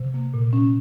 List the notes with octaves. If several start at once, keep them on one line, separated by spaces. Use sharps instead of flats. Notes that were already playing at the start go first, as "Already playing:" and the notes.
Already playing: C3
A#3
A#2
C#4